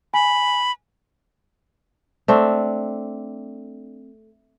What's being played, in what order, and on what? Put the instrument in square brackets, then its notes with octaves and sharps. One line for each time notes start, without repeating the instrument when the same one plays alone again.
[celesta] G#5 [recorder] B5
[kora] A3 C4 D4